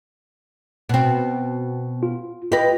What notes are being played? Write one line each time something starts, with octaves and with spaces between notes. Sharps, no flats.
B2 C4
F4
F4 G4 B4 D#5 A#6